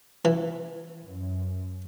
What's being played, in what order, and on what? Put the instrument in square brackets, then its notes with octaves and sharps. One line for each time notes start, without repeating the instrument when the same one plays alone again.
[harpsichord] E3
[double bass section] F#2